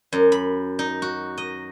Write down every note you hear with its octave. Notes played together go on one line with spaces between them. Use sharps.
F#2
B5
D#4
F#4
D#5